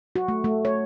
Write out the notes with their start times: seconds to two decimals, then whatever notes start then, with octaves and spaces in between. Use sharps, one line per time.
0.16 F#4
0.28 A3
0.44 A3
0.65 C#5